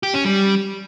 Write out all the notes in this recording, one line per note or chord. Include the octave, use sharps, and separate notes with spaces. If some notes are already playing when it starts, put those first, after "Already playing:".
G4
C#4
G3